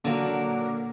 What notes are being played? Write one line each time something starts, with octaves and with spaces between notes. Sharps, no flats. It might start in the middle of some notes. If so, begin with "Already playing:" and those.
A#2 D3 F#3 A#3